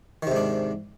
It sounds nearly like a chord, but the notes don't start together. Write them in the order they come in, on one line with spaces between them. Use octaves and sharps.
D#3 C3 G#2 D4